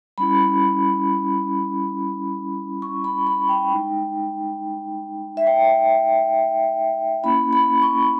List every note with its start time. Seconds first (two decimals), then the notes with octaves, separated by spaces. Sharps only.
0.18 G3 C#4 E4 B5
2.82 C#6
3.04 B5
3.27 B5
3.49 G5
3.71 G#3 D#4
5.37 E5
5.47 G5
7.24 A#3 C#4 E4 B5
7.53 B5
7.82 C#6